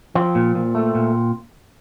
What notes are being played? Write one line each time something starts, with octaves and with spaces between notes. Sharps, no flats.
F3 C4
A#2
A#2
A3
A#2